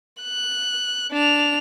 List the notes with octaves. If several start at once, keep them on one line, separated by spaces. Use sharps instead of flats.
F#6
D4 F7